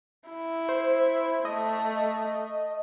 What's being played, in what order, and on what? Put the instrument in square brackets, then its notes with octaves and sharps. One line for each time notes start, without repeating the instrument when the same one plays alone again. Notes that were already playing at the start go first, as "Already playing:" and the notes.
[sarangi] E4
[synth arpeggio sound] C5
[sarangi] A3 [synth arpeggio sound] D#5